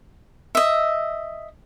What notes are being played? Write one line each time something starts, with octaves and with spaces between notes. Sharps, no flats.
D#5 E5